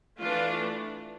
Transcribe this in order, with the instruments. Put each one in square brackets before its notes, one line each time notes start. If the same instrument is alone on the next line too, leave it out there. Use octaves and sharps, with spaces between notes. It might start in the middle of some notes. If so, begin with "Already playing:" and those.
[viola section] E3 A3 D4 F4